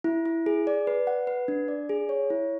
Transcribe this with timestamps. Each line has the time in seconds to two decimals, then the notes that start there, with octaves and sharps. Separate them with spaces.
0.04 E4
0.26 E4
0.46 G#4
0.67 D5
0.87 B4
1.07 F#5
1.27 B4
1.48 D4
1.68 D5
1.89 G#4
2.09 C#5
2.30 E4